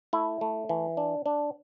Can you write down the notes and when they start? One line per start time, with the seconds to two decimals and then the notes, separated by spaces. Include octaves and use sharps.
0.13 A3 E4
0.41 A3
0.69 E3
0.97 D4
1.26 D4